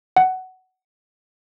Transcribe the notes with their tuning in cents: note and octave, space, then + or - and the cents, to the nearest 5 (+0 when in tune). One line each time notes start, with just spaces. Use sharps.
F#5 +15